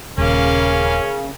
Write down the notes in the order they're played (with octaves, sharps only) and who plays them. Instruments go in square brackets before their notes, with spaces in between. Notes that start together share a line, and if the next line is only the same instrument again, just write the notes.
[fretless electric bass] D#1 [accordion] C#3 [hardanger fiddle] A#3 F5 [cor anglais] C#4